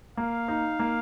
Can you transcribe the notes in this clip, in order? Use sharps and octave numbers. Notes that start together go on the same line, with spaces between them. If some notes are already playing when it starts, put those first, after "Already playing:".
A#3 F5
D#4
A#3